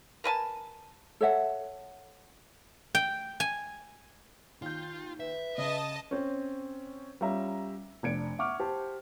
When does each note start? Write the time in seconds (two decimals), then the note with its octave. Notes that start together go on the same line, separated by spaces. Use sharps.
0.24 A#4 B4 G#5 A5
1.21 A4 C#5 E5 F#5
2.95 G5
3.40 G#5
4.62 D#2 F4 G6
5.20 B4 E5
5.58 C#3 D#5 A5
6.11 C4 C#4
7.21 G3 C#4 F4 E5 A#5
8.03 F1 D4 G#6 C#7 D7
8.39 E5 F#5 C#6 D6 F6
8.60 G4 C5 A5